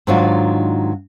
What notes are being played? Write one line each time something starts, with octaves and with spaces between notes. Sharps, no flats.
G#2 D#3 F#3 D4 F4 F#4